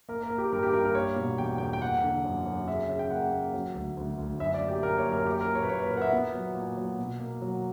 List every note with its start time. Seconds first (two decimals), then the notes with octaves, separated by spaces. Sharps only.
0.09 A#3 A#4
0.23 A#4
0.31 A#3
0.38 G4
0.52 G2 A#4
0.63 G4
0.73 G2 A#4
0.85 A#4
0.95 A#3 C#5
1.16 B2
1.38 E2 G5
1.58 E2 G5
1.73 G5
1.81 A#3 F#5
2.03 D3
2.25 F#2
2.46 F#2
2.67 C#3 E5
2.89 C#3
2.99 G5
3.11 A#3 F#5
3.33 A#3
3.54 F#3
3.75 D2
3.97 D2
4.18 D2
4.40 F#2 E5
4.54 D5
4.62 A#3
4.68 G4
4.83 A#3 A#4
4.98 C#5
5.04 F#2
5.12 A#4
5.26 A#3 G4
5.41 A#4
5.47 A#2
5.55 C#5
5.63 B4
5.69 A#3 C#5
5.80 B4
5.91 A#2 A#4
5.97 F#5
6.02 E5
6.13 B3
6.34 F#3
6.55 A#2
6.77 F#3
6.99 B2
7.20 A#3
7.42 F#3